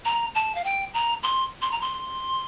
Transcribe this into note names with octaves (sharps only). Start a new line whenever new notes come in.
A#5
A5
F5
G5
A#5
C6
C6
A#5
C6